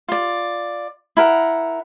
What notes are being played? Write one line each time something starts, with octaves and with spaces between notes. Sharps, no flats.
F4 D5
E4 A#4 F#5